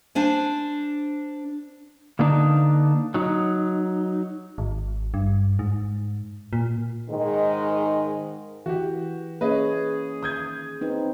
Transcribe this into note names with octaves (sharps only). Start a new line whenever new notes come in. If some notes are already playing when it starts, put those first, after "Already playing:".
D4 C5 G#5
D3 A#3 B3 D4 D#4
F#3 D#4
G#1
G2
G#2
A#2
G#2 D#3 G#3
E3 F#4 G4
A#3 C#4 G#4 B4 C#5 D#5
D#3 D#6 G6 G#6
C4 D#4 B4